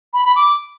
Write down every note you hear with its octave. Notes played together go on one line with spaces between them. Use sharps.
B5
B5
D6